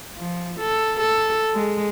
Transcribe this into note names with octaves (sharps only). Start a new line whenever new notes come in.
F3
A4
A4
G#3